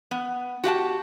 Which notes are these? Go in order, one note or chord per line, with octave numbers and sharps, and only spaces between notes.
B3
F#4 G4 F5 A5